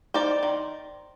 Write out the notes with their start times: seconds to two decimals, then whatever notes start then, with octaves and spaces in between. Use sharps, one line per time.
0.14 D#4 C5 D5
0.43 D#3